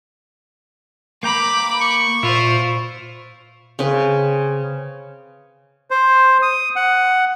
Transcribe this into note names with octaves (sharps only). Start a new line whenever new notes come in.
A#3 G5 A#5 B5 D6
C#6
A#2 E4 F4 C5
C#3 C4 B4
C5
D#6
F#5